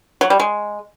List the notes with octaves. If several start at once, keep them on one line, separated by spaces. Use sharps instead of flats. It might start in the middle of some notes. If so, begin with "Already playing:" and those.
F#3
G3
G#3